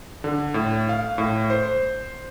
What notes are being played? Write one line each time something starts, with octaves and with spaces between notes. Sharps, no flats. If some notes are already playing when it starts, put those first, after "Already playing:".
D3
A2
F5
A2
C5